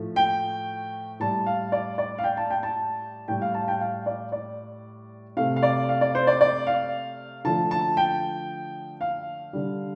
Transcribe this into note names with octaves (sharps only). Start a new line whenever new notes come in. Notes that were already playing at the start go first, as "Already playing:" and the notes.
Already playing: A2 F3 A3
G5
A2 G3 A5
F5
D5
D5
F5
G5
A5
G5
A5
A2 G3 G5
F5
A5
G5
F5
D5
D5
C3 A3 F5
F5
D5
F5
D5
C5
D5
D5
F5
D3 F3 A3 A5
A5
G5
F5
D3 G3